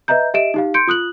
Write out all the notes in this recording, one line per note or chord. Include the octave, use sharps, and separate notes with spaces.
B4 D#5 E5 A#5 G6
G4 D#5 E5 D7 E7
D#4 G4 F5
C6 G6 C#7 D7
F4 D#6 F#6 F#7